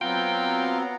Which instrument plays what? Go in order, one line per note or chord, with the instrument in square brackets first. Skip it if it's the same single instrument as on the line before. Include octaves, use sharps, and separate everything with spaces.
[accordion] F#3 C4 [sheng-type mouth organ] B3 F#5 A#5 [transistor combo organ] F4 [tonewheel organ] G5